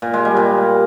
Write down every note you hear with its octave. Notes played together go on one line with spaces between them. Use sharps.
A#2
G#3
G3
A#2